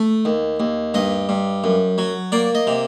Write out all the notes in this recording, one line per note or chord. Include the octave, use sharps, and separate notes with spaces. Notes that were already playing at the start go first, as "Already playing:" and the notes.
Already playing: A3
D#2
D#2
G2 D#5
G2
F#2
F#3
A#3 D5
D#5
C3